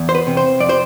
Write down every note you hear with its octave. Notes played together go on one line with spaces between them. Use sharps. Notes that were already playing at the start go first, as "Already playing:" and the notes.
Already playing: E2
C5
B4
C3
C5
F2 D5
C5